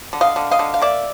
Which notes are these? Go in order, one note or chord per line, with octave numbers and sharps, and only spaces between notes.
D3
D#5 F5
D3
D#5 F5
D3
F5
A#3 D5 E5